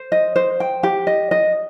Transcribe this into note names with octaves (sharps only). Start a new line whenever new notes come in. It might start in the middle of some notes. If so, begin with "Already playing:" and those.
Already playing: C5
D#5
C5
G5
G4
D#5
D#5